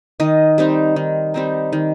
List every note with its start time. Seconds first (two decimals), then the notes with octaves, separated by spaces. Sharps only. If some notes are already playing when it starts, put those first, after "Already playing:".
0.20 D#3 D#5
0.58 G3 C4 D#4
0.96 D#3
1.34 G3 C4 D#4
1.73 D#3